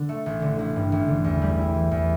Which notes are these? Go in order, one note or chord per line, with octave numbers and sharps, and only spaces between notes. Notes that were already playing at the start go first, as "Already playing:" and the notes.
Already playing: D3
A3
A1
D3
A1
G2
A1
D3
E2
G3
E4
E3
E2